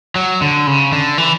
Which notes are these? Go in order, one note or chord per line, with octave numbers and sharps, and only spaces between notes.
F#3
D3
C#3
D3
E3